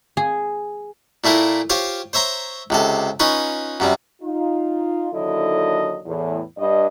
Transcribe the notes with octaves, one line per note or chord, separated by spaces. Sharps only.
G#4
A#2 A3 E4 F4 A#4
F4 G4 C5 C#5 F5
C5 C#5 E5 A#5 C6
C#2 C3 A4
C#4 D#4 F4 B4 C#5
F#2 C3 G3
D#4 F4
D#2 D3 F#3 E4 A4 D#5
E2 A2 E3
G2 D#5